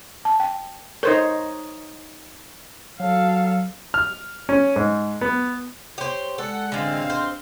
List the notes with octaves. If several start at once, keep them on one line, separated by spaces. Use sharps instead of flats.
A5
G5
D#4 A4 A#4 C5 C#5
F#3 A4 F5
F6
C#4
G#2
B3
G4 C5 C#5 C#6
G#3 A4 D5 F#5
A1 D3 G#3 C4 D4 G#4 D#5 F5
C5